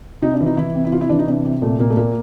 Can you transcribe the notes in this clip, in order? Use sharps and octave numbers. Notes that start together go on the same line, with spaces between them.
C3 D#4
D4
E3
D#4
E3 E4
C3
E4
C3 F4
E4
E3 D4
D#4
C3 D4
C3
A#2 A3
A#2 A#3
A3
A#2 A#3